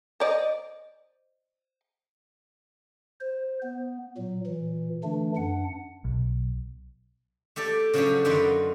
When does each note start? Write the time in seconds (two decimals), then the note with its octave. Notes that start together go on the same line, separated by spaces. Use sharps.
0.20 C5 D5 D#5
3.20 C5
3.63 B3
4.17 A#2 F#3
4.46 A#2 E3
5.04 D3 E3 A3 D4
5.36 F#2 D4 F#5
6.05 B1
7.56 A3 G4 A4 D5
7.94 C#3 F3 F#3 C#4 D4 G4
8.25 F#2 D3 D#3 F4 F#4 B4